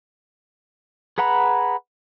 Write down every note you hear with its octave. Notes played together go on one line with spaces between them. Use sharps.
G#4 B4 F#5 A#5 B5